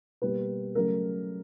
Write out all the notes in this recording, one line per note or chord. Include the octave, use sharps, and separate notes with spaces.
B2 G3 A#3 B4
C#3 F#3 A3 A#4